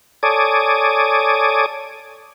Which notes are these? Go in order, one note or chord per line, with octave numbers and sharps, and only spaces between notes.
A4 C#5 D5 G#5 D6 D#6